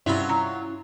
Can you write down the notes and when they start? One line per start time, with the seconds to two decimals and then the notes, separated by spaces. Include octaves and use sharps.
0.06 G2 C3 F#3 C#4 E4 F4 E5 B5
0.29 A#5